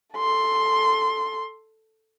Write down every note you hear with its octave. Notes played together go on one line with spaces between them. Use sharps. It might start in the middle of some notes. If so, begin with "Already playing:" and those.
A4 C6